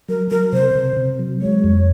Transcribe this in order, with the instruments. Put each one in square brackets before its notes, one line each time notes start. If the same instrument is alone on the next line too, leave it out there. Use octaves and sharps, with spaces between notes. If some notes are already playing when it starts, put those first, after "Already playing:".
[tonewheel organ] F#3 [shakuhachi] A#4
[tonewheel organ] F#3 [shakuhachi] A#4
[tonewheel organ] C3 [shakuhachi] C5
[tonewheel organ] C3
C3
F#3
[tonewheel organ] G#3 [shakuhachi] C#5
[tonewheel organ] F2